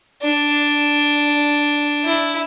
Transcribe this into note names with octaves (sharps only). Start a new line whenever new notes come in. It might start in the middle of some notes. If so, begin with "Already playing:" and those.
D4
E4